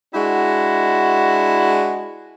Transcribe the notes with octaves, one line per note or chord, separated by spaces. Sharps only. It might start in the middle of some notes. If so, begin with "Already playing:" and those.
G#3 D4 E4 F#4